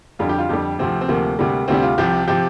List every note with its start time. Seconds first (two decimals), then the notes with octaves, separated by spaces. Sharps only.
0.19 F2 D3 G3 F4
0.29 G4
0.38 F4
0.49 F2 D3 G3 G4
0.79 D2 C3 F3 C4
1.01 C4
1.08 D2 C3 F3 A#3
1.39 D2 C3 G3
1.68 D2 C3 G3 C4
1.82 F4
1.98 C2 C3 F3 G4
2.27 C3 F3 G4